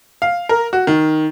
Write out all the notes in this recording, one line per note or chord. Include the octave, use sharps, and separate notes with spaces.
F5
A#4
F#4
D#3